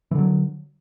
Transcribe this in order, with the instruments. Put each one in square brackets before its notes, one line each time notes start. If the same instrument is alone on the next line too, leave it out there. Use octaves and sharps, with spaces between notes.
[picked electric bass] E3
D3
F#3